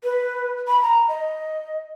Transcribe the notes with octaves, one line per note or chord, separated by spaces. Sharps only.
B4
B5
A#5
D#5